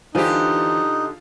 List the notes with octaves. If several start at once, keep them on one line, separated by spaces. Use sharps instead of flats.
D3 E3 D#4 F4 G4 C5 G#5